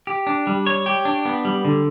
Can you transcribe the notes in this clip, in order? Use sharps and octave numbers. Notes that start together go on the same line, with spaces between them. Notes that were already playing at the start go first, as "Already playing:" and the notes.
G4
D4
G3
C#5
G4
D4
B3
G3
D3